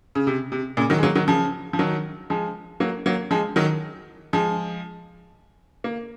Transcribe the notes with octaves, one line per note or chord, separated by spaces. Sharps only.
C#3
C3
C3
A#2 C#3
D#3 F#3
G#3
F#3 A#3
D#3 F#3
C#3 F3
F3
D#3 F#3
F3 G#3
F#3 A#3
F#3 A#3
F3 G#3
D#3 F#3
F3 G#3
A#3